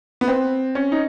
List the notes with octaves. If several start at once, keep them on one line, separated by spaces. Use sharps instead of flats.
B3
C4
C#4
D#4